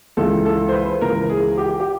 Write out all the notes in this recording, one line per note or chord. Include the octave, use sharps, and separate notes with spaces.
C#2 C#3 E3 A4
A4
C5
B4
C#2 C#3 E3 A#4
G#4
G4
G4